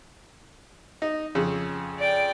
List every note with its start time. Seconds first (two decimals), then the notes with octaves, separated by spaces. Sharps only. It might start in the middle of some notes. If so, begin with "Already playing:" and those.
1.02 D#4
1.35 F2 C#3
1.99 D5 G5